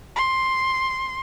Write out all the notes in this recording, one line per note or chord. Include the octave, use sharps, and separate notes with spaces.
C6